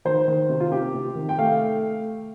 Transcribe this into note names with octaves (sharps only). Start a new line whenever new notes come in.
D#3 C5
D#3
C3
F4
C3 G4
C3
D#3
G5
A3 F5